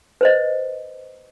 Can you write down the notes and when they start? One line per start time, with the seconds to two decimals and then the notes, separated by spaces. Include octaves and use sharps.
0.21 B4 C5 D#5